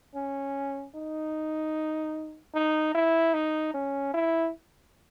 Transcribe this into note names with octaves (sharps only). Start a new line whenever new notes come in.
C#4
D#4
D#4
E4
D#4
C#4
E4